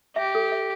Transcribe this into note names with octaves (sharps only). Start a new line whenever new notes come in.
G4 E5
A4
E5